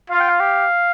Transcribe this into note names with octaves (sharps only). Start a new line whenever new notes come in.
F4 F5
G5
F5
G4